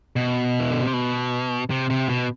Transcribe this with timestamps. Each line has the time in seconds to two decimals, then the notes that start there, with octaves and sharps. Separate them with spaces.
0.16 B2
0.60 E3
0.71 D3
0.82 C3
0.93 B2
1.70 C3
1.90 C3
2.09 B2